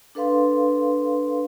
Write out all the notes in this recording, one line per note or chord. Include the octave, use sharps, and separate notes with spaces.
D4 A4 B4 F5 C6